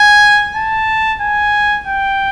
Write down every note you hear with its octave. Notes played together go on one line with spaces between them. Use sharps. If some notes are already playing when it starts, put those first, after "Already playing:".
Already playing: G#5
A5
G#5
G5